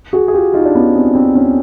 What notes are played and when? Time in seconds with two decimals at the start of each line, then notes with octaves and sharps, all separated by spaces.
0.13 F#4 G#4
0.28 G#4
0.34 F4 G4
0.54 D#4 F4
0.65 D4
0.75 B3 C#4
0.95 C4
1.15 C4
1.35 B3 C#4